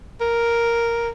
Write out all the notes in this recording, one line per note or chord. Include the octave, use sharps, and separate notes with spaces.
A#4